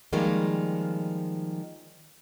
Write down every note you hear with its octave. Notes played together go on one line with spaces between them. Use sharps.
D#3 F3 G3 G#3 A#3